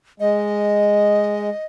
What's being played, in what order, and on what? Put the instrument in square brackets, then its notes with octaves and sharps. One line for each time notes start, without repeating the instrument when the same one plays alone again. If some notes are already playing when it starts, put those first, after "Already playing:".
[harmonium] G#3 [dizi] D#5